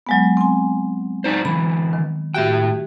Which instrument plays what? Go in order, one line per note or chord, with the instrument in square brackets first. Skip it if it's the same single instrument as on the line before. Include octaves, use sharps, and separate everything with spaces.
[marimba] F#3 G#3 B3
C4 G#5
[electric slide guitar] D4 D#4 C5
[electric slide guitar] D3 E3 [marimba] B5
[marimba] D#3
[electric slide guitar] A2 G5 [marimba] F#4 G4 E5